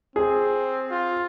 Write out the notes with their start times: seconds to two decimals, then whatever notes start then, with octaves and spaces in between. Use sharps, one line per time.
0.16 C4 G#4
0.91 F4